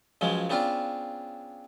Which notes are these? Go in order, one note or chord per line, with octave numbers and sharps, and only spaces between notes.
C#2 F3 F#3 G#3
C#3 B3 C4 D4 F4